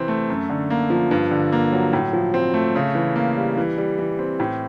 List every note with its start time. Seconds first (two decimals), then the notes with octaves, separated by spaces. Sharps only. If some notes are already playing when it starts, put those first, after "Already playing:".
Already playing: C3 E3 C4
0.08 A3
0.29 F#2
0.50 D3
0.70 A#3
0.90 F3
1.11 G2
1.31 D3
1.52 A#3
1.72 F#3
1.93 A2
2.13 F3
2.34 C4
2.54 A3
2.75 C#3
2.95 E3
3.16 A#3
3.37 G3
3.58 E3
3.78 G3
3.98 E3
4.19 C4
4.40 A2